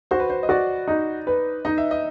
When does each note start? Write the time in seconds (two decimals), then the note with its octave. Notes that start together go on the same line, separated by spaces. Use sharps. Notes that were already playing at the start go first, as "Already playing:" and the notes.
0.11 F#4 C5
0.20 B4
0.30 C5
0.43 D#5
0.49 F#4 D5
0.88 D#4
1.27 B4
1.65 D#4 D#5
1.78 E5
1.91 D#5